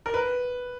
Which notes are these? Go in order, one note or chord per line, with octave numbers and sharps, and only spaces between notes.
A#4
B4